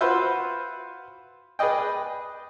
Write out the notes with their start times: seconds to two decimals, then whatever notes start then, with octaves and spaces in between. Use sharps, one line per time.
0.01 F4 F#4 B4 C5 E5
1.59 G#4 B4 D5 D#5 G5